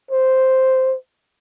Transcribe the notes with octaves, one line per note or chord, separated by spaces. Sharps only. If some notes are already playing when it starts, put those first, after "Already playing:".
C5